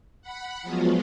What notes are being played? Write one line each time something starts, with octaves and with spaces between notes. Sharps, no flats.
F#5 B5
F3 F#3 G#3 B3 F4 F#4